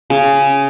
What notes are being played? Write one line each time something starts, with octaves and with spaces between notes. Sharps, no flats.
C#3